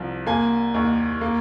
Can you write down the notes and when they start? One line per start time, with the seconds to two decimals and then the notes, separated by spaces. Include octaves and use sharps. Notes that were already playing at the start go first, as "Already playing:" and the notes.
Already playing: C2 F3
0.26 A#3 G#5
0.74 D#2
1.21 A#3